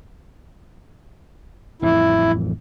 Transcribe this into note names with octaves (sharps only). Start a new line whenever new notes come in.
A1 F2 E3 E4